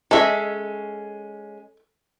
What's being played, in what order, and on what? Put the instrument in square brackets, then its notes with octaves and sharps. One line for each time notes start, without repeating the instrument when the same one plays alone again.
[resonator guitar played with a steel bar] G#3 C#4 [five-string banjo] A4 E5